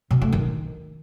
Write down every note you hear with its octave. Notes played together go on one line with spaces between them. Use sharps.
B2
A3
D#3